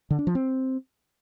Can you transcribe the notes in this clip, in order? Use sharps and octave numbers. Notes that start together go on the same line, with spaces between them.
D3
D4
F3
C4